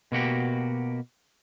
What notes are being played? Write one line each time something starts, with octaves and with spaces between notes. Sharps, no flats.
B2 A#3 F#4 G4